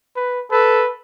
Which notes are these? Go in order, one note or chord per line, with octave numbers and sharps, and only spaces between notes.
B4
A4 B4